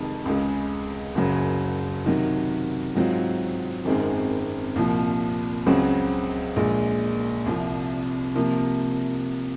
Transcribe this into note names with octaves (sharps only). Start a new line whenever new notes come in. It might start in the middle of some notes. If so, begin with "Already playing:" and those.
Already playing: F1 F2 C3 D#3 G#3
C#2 C#3 G#3
F#1 F#2 C#3 F#3
C3 D#3 F#3
G#2 F#3 C4 F4
G#1 F#2 D#3 G#3 C4
C2 A#2 F3
C#2 C#3 F#3 C4 F#4
A#1 A#2 G#3
C2 C3 F3
C3 F3 A#3